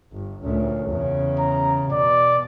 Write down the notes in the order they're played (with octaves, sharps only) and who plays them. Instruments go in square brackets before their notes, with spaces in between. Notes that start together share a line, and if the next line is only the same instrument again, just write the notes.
[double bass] G1
[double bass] D2 A#2 [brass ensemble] C#4
[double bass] E2 C#3
[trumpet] A#5
[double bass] B2 [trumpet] D5